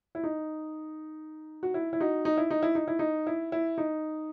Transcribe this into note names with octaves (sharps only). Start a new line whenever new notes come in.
E4
D#4
F#4
E4
E4
D#4 F#4
D#4
E4
D#4
E4
D#4
E4
D#4
E4
E4
D#4